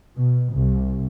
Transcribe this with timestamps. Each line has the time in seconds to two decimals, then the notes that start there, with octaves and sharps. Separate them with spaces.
0.17 B2
0.55 C2